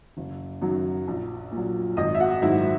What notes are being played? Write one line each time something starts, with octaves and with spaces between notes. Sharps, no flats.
F#1
F#2 D#3 F#3
A#1
A#2
F#3
G#1 D#5 D#6
E5
F#4 F#5
G#2 D#3 F#3 E4 E5